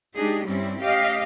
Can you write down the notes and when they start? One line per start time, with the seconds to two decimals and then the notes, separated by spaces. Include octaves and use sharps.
0.15 G#3 D4 D#4 G4 G#4
0.45 G2 G3 C4 C#4 E4
0.79 A3 C#4 G4 D#5 F5